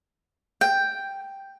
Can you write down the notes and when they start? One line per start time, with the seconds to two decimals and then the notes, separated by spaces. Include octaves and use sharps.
0.61 G5